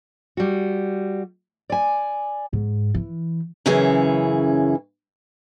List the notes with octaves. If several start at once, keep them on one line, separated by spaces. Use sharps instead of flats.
G3 F#4
D5 G#5
G#2
E3
F#2 C#3 E3 C#4 E4 G#4